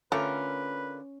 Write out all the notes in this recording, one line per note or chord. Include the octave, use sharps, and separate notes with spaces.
D3 A3 C#4 F4 A#4 B4